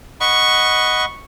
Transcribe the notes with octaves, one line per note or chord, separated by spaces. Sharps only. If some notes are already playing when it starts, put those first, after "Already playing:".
D#5 F#5 B5 C#6